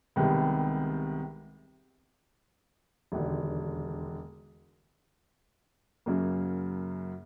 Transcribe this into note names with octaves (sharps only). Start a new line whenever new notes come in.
C2 C3 D#3 G#3 B3
E1 D#2 D3
F#2 C#3 F#3 A#3